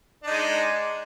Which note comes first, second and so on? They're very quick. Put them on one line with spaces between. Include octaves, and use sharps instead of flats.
D4 D#4 G#3